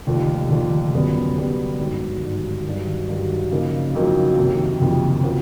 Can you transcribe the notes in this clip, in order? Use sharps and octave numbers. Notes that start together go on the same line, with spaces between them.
F1 D#2 D3 F3
F1 D#2 D3 F3
F#2 D3 G3 B3
F#2 D3 G3 B3
G#1 G2 D3 F#3
G#1 G2 D3 F#3
G2 D#3 F#3
G2 D#3 F#3
F2 C#3 F#3 A#3 D#4
F2 C#3 F#3 A#3 D#4
F#1 F2 C3 D#3
F#1 F2 C3 D#3
F3 A#3 C#4 F#4